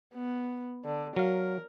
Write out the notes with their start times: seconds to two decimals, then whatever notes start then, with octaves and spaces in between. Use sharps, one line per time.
0.14 B3
0.85 D3
1.16 F#3 A#4 F5